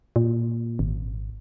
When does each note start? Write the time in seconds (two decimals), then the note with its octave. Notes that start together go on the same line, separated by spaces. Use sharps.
0.16 A#2
0.79 G#1